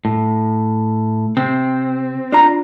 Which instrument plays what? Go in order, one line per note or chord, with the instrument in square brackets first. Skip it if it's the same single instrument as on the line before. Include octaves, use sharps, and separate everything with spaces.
[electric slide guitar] A2
[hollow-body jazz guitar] C3 [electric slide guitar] C4
[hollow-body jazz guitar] D4 F4 A#5